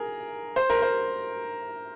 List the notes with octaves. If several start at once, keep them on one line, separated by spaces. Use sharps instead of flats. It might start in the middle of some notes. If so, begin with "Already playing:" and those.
Already playing: G#4 A#4
C5
A#4
C5